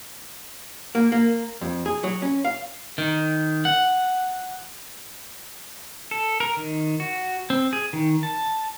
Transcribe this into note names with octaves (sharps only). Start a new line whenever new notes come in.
A#3
A#3
F2
G#4
F#3
C#4
F5
D#3
F#5
A4
A#4
D#3
F#4
C4
G#4
D#3
A5